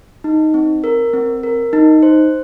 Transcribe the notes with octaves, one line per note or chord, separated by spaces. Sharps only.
D#4
C4
A#4
C4
A#4
D#4
C5